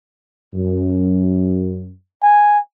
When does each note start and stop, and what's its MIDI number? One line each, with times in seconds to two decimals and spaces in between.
0.55 1.91 42
2.23 2.59 80